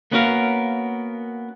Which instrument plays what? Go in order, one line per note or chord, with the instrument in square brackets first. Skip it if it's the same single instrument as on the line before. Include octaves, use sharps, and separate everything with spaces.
[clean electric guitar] A#3 B3 C#4 F#4 A#4 F5